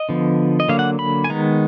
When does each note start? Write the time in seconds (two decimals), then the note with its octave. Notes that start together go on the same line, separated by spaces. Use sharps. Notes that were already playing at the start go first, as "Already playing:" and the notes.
Already playing: D#5
0.09 D3 F3 B3
0.60 D#5
0.69 D3 F#3 A#3 F5
0.79 F#5
0.99 B5
1.24 G#5
1.29 D#3 G#3 B3 A#5